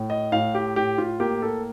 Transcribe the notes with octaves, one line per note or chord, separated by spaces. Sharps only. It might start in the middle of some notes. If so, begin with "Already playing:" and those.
Already playing: A2
D#5
A2 F5
G4
A2 G4
F4
A#3 G4
A4